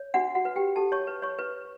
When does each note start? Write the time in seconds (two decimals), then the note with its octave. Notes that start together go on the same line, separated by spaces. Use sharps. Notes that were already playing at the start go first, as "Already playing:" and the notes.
Already playing: C#5
0.14 D4 F#4 F#5
0.35 F#4 F#5
0.45 B4
0.56 G4 G5
0.76 G4 A4 A5
0.92 C#5 C#6
1.07 B4
1.22 C#5 C#6
1.39 B4